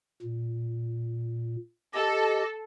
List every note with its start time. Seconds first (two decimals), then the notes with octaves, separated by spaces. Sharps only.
0.22 A#2
1.94 G4 A4 D#5